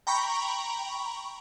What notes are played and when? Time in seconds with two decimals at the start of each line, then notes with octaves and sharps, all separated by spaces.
0.07 G5 A#5 B5 C#6